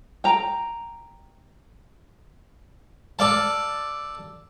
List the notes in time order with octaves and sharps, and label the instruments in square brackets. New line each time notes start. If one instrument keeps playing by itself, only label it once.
[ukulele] G5 A#5
[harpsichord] A4 D5 F5 A5